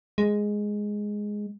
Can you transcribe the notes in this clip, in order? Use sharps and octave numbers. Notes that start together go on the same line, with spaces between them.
G#3